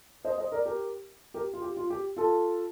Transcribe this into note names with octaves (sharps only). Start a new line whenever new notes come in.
C5 D#5
C5 D#5
A#4 D5
G4 A#4
G4 A#4
F4
G4
F4
G4
F4 A4